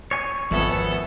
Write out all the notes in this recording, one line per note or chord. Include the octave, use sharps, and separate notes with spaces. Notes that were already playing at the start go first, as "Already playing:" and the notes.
C#5 G#5
G#1 F2 B3 A4 E5